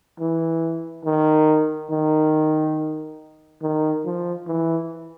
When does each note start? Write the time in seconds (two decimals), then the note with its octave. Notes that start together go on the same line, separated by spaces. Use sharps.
0.20 E3
1.05 D#3
1.91 D#3
3.62 D#3
4.05 F3
4.47 E3